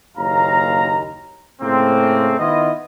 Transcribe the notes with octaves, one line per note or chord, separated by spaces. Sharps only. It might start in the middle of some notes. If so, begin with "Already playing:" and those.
F#1 D#2 C#4 F5 A#5
A2 C#3 A3 A#3 C4
D#3 B3 E4 F4 D#5